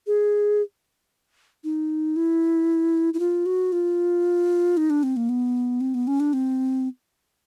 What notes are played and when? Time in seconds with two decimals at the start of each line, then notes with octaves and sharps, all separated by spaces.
0.07 G#4
1.64 D#4
2.16 E4
3.14 E4
3.19 F4
3.46 F#4
3.72 F4
4.77 D#4
4.90 D4
5.03 C4
5.17 A#3
5.29 B3
5.81 C4
5.94 B3
6.07 C#4
6.20 D4
6.33 C4